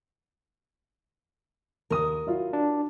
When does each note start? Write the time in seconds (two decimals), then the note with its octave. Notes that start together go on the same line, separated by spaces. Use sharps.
1.90 D#2 A#4 D#6
2.27 F#3 E4 F4
2.53 D4